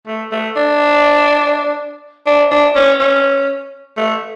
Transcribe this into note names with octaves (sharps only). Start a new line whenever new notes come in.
A3
A3
D4
D4
D4
C#4
C#4
A3